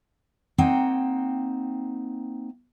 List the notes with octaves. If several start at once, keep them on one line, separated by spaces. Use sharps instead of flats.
A#3 C4 D#4 F#5 G5